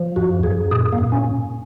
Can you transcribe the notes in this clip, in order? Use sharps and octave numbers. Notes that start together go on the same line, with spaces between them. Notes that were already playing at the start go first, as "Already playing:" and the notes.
Already playing: F3
F#2 F#4
F#2 G#4
A#2 G#4
A#3
A#2
C#4